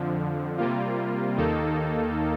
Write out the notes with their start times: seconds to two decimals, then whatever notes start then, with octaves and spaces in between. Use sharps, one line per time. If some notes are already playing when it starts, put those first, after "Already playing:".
Already playing: F2 D3 F3
0.58 C3 G3 A#3 F4
1.37 D#2 D#3 A#3 D#4 A4